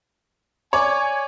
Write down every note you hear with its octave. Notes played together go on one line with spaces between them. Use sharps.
C#5 D5 G#5 D6